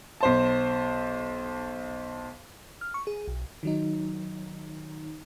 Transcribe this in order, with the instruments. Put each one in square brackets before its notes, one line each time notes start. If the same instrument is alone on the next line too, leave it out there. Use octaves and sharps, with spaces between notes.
[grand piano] B1 C5 A5
[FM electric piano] F6
C#6
G#4
B1
D#3 F#3 D#4